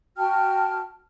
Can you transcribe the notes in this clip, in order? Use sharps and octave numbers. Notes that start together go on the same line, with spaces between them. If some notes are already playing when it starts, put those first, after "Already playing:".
F#4 G5 A5 F6